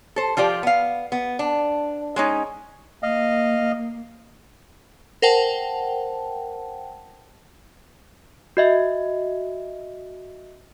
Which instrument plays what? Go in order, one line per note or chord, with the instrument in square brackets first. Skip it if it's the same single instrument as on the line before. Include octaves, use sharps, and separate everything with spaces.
[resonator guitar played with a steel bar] A4 C5
F3 F4 G4 D5
B3 F5
B3
D4
G#3 C#4 D#4
[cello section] A#3 [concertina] D#5 F5
[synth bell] A#4 C5 F#5 G5 A5
[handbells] F#4 D#5 E5